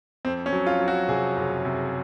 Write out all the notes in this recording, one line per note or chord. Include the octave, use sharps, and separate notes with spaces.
F2 C4
C#4
F#3
F4
F#3
F#4
C3 G#4
F#1
C3